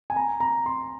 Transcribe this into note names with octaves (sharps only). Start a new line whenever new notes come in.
G#5
A#5
A#5
C6